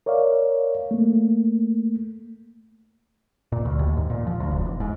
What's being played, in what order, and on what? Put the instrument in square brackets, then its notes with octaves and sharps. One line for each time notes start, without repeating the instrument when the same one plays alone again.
[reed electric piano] A#4 C#5 D5 E5 F5
A3 A#3
[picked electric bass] A#2
D2
D#2
G#2
A#2
F3
D2
D#1
E1
G#2